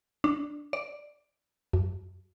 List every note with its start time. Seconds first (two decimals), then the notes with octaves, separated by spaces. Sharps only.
0.24 D4
0.73 D5
1.73 F#2